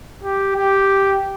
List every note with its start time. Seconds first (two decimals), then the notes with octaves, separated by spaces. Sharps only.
0.23 G4
0.56 G4